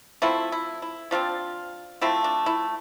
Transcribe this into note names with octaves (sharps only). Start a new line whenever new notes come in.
F3 A3 C4 E4
E4
E4
F3 A3 C4 D4 F4
F3 A3 C4 E4
D4
E4